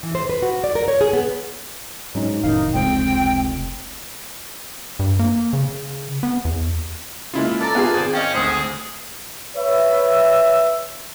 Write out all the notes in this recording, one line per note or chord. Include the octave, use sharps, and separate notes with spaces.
E3
C5
B4
F#4
D5
A#4
C#5
G#4
B3
G#2 F#3 C#4 D#4
F1 A2 D#3 D#4 F5
F1 C#2 C4 G5
G2
A#3
C#3
B3
E2
C#3 G#3 A#3 E4 F4
A4 D5 A5 A#5
B3 F4 G#4
G#1 G#4 C5
C#4 D#5 F5 G5
G#1 D2 G#4 C5 D#6
B4 C#5 E5